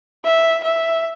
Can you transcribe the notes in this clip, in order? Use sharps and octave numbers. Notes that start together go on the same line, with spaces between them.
E5
E5